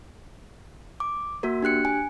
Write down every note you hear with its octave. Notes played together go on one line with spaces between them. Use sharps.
D6
A#3 F#4 A#4
D4 G4 F#6 C#7
G#5